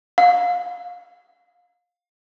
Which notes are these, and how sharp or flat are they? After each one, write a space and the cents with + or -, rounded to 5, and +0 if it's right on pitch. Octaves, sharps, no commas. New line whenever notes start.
F5 +25